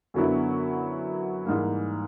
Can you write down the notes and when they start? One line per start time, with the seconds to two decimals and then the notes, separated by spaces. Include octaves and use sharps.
0.14 F#2 D3 F#3 B3 E4
1.45 G#2 E3 G3 A#3